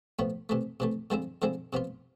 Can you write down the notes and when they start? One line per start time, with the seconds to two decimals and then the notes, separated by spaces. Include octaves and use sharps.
0.19 A2 F3 B3
0.49 C3 E3 A3
0.80 C3 E3 A3
1.10 D3 F3 G#3 C4 E4
1.42 D3 F3 G#3 C4 E4
1.73 C3 F3 B3 F4